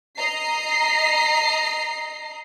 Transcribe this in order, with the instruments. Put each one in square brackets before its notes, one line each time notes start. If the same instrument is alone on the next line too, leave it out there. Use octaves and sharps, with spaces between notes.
[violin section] D#5 A#5 C7